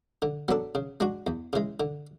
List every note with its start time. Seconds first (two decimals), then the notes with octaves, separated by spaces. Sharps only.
0.22 D3
0.48 F#3 B3 D4 A4
0.75 C#3
1.00 G#3 D4 F#4
1.27 E2
1.53 C#3 E3 G#3
1.80 D3